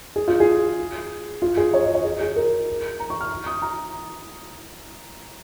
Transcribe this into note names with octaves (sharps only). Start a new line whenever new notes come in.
G#4
F4
G#4
F4
G#4
C#5
D#5
C#5
G#4
G#4
A#4
A#5
C#6
F6
D#6
A#5